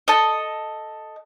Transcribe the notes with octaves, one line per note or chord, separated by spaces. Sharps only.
A4 D#5